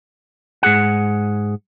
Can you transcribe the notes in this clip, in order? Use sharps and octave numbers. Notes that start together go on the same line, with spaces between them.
G#2 G#4 F#5